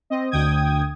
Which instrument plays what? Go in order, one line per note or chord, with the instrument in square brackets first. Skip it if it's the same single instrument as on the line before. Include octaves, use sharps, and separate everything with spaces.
[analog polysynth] C4 D#5
D2 D3 G5 D#6 G#6